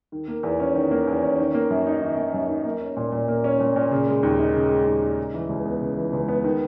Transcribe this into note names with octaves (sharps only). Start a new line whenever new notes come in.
D#3
A#3
E2
C#4
D#3
A#3
E2
C#4
D#3
A#3
F#2
D#4
D#3
A#3
F#2
D#4
A#3
C#4
A#2
A#2
A#3
C#4
A#2
A#2
C#3
G#3
D#2
D#4
C#3
G#3
D#2
D#4
C#3
E3
C#2
B3
C#3
E3
C#2
B3
D#3